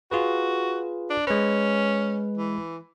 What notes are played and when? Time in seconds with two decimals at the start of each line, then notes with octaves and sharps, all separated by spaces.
0.11 F4 F#4 G#4 B4
1.10 D4
1.27 G#3 C#4 B4
2.37 E3